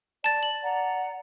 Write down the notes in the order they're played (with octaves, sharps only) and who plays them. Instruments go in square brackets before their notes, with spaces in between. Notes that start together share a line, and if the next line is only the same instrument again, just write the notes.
[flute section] D5 [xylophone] A5 A6
[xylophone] F#7
[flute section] D5 F#5 A#5